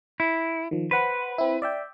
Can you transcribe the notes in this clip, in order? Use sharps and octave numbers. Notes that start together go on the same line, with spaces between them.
E4
D#3 F3
B4 C5 F#5 B5
C4 E4
D5 E5 G5